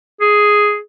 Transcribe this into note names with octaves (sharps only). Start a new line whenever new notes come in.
G#4